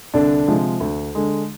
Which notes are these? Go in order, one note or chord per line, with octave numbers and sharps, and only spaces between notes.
C2 D3 D4
C3 F3 G#3
D2
D3 G#3